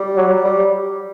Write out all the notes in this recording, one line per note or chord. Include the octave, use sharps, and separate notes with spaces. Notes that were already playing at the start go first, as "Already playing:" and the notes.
Already playing: G3
F#3
G3